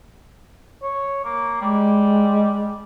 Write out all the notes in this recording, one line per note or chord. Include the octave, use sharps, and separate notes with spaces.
C#5
A#3
G3 G#3